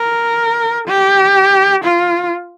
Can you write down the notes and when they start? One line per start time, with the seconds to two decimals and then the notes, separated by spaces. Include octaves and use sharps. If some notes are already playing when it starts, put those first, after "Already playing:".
Already playing: A#4
0.88 G4
1.84 F4